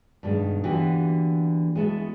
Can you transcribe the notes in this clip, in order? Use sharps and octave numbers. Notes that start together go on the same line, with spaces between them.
G2 B2 D#3 G#3
D3 E3 A#3 B3 F#4 G4
G#3 B3 E4 F#4 A4